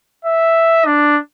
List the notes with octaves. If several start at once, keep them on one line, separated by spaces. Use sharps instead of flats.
E5
D4